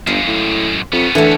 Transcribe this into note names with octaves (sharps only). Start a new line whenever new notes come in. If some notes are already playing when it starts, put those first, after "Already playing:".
G1 F#2 G#3 F5
A2
F2 B3 C#4
D3 E3 A3